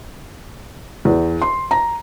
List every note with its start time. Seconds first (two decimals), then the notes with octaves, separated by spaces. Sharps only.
1.05 E2
1.42 C6
1.71 A#5